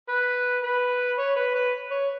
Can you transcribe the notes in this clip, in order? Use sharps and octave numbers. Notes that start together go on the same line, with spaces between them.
B4
B4
C#5
B4
B4
C#5